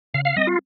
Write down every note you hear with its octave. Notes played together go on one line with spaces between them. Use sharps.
C#3 F5
F5
G3 C4 D#5
F4